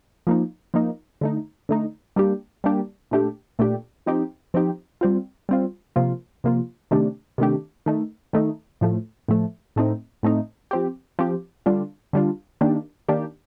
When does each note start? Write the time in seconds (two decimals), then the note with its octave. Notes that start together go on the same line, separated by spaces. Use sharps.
0.27 F3 A#3 D#4
0.74 F3 A#3 D#4
1.21 D3 A3 D#4
1.69 D3 A3 D#4
2.16 G3 A#3 D4 G4
2.64 G3 A#3 D4 G4
3.11 A#2 A3 D4 G4
3.59 A#2 A3 D4 G4
4.06 F3 C4 D#4 G4
4.54 F3 C4 D#4 G4
5.01 G3 C4 F4
5.49 G3 C4 F4
5.96 C3 F3 A#3 F4
6.44 C3 F3 A#3 F4
6.91 C3 D#3 A3 D4 G4
7.38 C3 D#3 A3 D4 G4
7.86 D#3 A3 D#4
8.33 D#3 A3 D#4
8.81 A2 F3 A3
9.28 A2 F3 A3
9.76 A2 A3 C4 D#4
10.23 A2 A3 C4 D#4
10.71 F3 C4 G4
11.19 F3 C4 G4
11.66 D3 G3 D4 F4
12.13 D3 G3 D4 F4
12.61 D#3 A#3 D4 G4
13.09 D#3 A#3 D4 G4